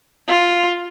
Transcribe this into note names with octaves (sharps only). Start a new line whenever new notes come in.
F4